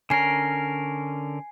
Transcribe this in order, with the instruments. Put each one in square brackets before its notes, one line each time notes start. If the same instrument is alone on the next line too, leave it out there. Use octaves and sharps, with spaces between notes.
[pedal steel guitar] D3 C#4 A#4 [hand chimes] G#5 C7